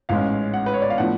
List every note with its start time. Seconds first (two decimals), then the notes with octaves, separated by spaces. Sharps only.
0.09 A1 G#2 G#3 C#4 F5
0.54 F#5
0.66 B4
0.74 C#5
0.82 D5
0.90 F5
0.98 A2 F3 B3 D4 F#5